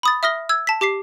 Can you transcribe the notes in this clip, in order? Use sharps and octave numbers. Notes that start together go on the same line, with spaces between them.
B5 D#6 A6
E5 D#6 F6 A#6 G7
E6 G#6
A5 B6
G4 D6 B6 C7